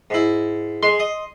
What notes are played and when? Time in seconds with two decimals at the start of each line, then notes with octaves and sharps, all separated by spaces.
0.10 G#2 E4
0.83 G#3 C6
1.00 D#5